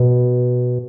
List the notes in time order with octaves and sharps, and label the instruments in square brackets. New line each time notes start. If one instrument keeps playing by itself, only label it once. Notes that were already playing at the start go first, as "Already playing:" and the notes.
Already playing: [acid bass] B2